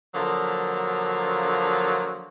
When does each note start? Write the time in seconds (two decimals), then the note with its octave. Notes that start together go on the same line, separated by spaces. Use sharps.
0.14 D3 F3 F#3 A#3